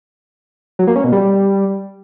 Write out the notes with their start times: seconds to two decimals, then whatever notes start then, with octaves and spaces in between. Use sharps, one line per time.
0.79 F#3
0.87 A#3
0.96 C#4
1.04 B2
1.12 G3